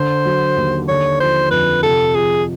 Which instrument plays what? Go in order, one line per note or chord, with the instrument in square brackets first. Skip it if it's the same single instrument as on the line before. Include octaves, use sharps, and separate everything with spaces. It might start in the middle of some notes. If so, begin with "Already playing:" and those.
Already playing: [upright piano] D3 [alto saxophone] C5
[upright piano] F#3
D#2
[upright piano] D3 [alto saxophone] C#5
[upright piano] F3 [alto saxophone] C5
[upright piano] F2 [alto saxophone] B4
[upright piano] C3 [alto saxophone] A4
[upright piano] F3 [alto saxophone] G#4